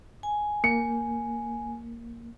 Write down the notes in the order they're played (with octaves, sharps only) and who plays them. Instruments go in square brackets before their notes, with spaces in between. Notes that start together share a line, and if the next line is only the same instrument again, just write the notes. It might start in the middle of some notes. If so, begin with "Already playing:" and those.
[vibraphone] G#5
[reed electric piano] A#3 [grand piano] C#7